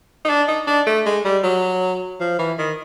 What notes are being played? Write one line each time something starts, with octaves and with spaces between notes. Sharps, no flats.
D#4
D4
D#4
D4
A3
G#3
G3
F#3
F3
E3
D#3